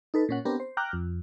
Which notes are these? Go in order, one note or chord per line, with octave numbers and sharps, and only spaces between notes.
D#4 A4 B4
A#2 C#4 F#5
B3 C4 D4 G4 A#4
C5
G5 A#5 D6 F6 F#6
F2